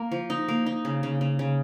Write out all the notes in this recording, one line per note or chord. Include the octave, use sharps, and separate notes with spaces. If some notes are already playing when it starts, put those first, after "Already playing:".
Already playing: A#3
F3
D#4
A#3
D#4
C#3
C#3
C#3
C#3